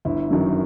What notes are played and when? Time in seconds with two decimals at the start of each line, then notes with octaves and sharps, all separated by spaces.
0.05 G1 E4
0.30 F#2 D#3 F#3